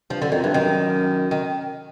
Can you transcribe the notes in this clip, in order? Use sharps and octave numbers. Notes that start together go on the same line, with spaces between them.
G2 F3
F#2 D3
F2 D#3
G2 E3
F#2 D#3
D#3